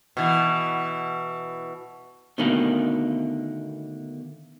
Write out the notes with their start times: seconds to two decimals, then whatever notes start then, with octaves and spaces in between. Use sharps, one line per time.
0.17 B2 E3
2.38 B2 D3 D#3 A3 A#3 C#4